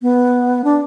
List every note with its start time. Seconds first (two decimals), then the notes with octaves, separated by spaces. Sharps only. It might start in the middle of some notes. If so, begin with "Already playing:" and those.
0.02 B3
0.64 D4